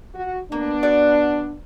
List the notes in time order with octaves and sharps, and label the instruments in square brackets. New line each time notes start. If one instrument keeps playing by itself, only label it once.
[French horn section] F#4
[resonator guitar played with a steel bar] A#3 [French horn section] B3 D4
[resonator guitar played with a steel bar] F#4 D5